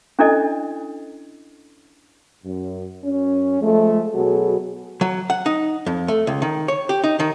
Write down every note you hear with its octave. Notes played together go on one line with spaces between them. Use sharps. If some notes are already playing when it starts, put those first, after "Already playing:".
C#4 D4 E4 A4 D5 D#5
F#2
F#2 C#4
F3 G#3 A3
B2 F#3 F#4 G#4 A4
F#3
F#5
D#4
F2
A3
C#2
D#3
C#5
G4
D#4
D#3